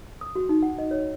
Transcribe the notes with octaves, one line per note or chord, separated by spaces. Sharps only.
D#6
F#4
D#4
F#5
D#5
C#5